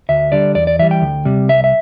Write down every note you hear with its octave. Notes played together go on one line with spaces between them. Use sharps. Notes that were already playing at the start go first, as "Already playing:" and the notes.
D2 E5
D3 G3 D5
E2 D5
D5
E3 G3 E5
G5
D2
C3 G3
C2 E5
E5